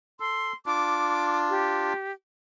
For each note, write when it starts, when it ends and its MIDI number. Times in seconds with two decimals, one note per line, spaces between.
0.20 0.53 69
0.20 0.53 84
0.66 1.93 62
0.66 1.93 65
0.66 1.38 86
1.49 2.12 67